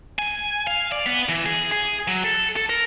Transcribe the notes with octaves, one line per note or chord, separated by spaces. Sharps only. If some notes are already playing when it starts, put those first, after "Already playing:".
G#5
F5
D5
B3
E3
G#4
G#4
F#3
A4
A4
A#4